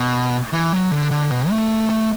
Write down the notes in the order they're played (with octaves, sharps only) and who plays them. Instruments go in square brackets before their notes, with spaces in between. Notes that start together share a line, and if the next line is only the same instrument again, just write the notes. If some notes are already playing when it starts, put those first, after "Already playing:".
Already playing: [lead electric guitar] B2
E3
F#3
D3
D3
B2
A3
A3